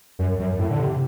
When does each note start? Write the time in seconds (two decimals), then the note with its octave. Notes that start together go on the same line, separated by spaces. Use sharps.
0.19 F#2
0.39 F#2
0.59 A2
0.70 D3
0.79 C3